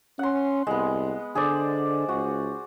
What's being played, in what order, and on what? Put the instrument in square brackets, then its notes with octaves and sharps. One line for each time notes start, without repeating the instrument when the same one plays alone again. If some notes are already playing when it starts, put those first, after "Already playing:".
[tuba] C#4 [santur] F#5 C6
[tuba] C2 [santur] G#3 B3
[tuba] D3 [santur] G#4 C5 D5
[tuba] C#2 [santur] F#4